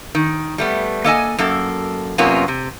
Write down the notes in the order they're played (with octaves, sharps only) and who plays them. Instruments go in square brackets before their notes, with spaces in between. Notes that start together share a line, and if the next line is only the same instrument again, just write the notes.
[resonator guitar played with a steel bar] D#3
G3 A3 B3
A#3 A4 D#5 G#5
F#2 A#3 A4
F#2 C3 A#3 B3 C#4 F4
C3